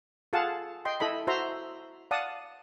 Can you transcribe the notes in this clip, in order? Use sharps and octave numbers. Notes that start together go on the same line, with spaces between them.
F4 G#4 A4 F5 F#5 A5
D#5 G5 C6
E4 A4 D#5 B5
E4 F#4 C5 E5 A#5 C6
D5 F5 F#5 A5 D#6